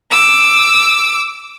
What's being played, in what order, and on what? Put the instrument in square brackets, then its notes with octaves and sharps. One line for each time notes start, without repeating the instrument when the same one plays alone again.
[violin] D6 E6